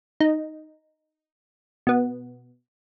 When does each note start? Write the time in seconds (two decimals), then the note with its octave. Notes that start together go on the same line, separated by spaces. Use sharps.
0.20 D#4
1.87 B2 B3